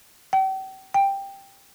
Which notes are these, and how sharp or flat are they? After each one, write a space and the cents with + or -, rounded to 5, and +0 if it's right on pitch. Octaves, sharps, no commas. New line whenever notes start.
G5 -40
G5 +10